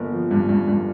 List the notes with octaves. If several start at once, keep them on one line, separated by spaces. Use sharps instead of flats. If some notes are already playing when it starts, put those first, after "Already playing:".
Already playing: G1 A#3
F3
G2
G2
G2